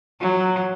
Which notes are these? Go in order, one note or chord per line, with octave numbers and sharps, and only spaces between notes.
F#3